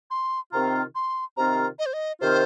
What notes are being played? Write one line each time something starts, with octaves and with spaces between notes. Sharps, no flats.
C6
C3 D#3 C4 F4 A#5
C6
C3 D#3 C4 F4 A#5
D#5
C5
D#5
C3 D#3 C4 F4 C5